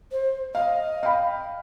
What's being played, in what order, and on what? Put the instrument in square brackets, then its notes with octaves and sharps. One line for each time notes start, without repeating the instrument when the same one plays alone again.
[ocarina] C5
[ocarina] D#5 [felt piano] F5
[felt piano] F5 G5 B5